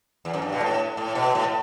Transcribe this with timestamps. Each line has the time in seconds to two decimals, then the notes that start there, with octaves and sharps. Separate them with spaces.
0.25 E2
0.33 F#2
0.42 G2
0.52 B2
0.61 A2
0.97 A2
1.15 B2
1.35 A2